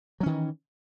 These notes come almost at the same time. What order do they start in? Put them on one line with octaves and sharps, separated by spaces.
F#3 C#4 D#3 E3